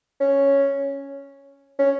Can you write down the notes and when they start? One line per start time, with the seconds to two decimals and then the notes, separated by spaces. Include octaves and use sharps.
0.20 C#4
1.79 C#4